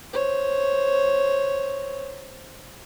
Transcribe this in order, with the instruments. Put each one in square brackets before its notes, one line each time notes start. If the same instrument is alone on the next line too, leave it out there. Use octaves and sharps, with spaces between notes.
[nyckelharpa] C5 C#5